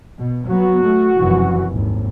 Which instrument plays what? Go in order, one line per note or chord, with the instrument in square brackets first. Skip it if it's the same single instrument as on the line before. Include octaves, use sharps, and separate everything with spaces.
[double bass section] B2
[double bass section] F#3 B3 [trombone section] F#4
[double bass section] A3
F1 F#2 E3
G#1 D#2